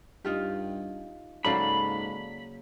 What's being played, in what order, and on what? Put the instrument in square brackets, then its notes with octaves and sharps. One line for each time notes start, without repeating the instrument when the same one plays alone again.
[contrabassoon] G2 [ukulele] D#4 F4 G4
[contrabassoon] G#2 [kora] C#3 F#3 A#3 [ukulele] A4 D5 F5 [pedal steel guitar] B5